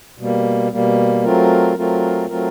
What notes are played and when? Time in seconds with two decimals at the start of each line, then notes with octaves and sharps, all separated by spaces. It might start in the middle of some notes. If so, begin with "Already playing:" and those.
0.18 B2 G3 A#3
0.72 B2 G3 A#3
1.24 F#3 A3 C4 F4 A#4
1.77 F#3 A3 C4 F4 A#4
2.29 F#3 A3 C4 F4 A#4